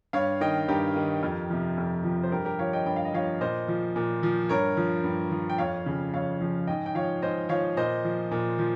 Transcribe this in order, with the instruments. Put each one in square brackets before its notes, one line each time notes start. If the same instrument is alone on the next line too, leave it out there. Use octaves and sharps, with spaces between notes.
[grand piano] G2 C#5 F5
D#3 D#5 G5
G2 G4 A#4
D#3
F2
C3 F3
F2
C3 F3
C5
G2 G4 A#4
G4 A#4
F3 C#5 F5
D#5 G5
G2 G5
F5
D#5
F3 C#5 F5
A#2 C5 D#5
F3
A#2
F3
G2 A#4 C#5
F3
G2
F3
G5
F2 C#5 F5
C#3 F3
F2 C#5 F5
C#3 F3
G#2 D#5 G5
G5
F3 C#5 F5
G#2 C5 D#5
F3 C#5 F5
A#2 C5 D#5
F3
A#2
F3